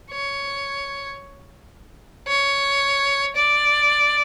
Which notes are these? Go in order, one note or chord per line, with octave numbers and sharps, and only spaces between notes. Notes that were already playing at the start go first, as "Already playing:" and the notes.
C#5
C#5
D5